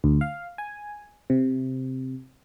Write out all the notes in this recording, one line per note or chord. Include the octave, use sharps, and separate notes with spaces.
D2
F5
G#5
C3